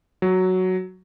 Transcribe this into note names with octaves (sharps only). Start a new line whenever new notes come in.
F#3